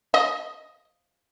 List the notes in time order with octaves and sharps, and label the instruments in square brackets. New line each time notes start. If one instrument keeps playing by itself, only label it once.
[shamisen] D#5